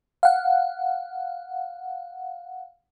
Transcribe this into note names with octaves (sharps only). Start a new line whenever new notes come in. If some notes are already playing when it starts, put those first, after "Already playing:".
F5 F#5